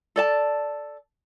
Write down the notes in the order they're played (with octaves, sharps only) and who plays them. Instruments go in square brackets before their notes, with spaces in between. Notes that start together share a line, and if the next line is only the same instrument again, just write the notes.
[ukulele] A4 D5 A5